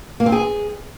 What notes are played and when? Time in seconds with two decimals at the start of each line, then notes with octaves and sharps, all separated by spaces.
0.20 A#3
0.26 C4
0.32 G#4